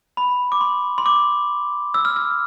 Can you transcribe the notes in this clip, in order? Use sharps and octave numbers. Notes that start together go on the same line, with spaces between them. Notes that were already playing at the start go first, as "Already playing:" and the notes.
B5
D6
C6
C6
D6
E6
F6
F6